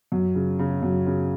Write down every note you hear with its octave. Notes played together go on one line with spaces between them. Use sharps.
F#2
C#3
C#3
F#2
C#3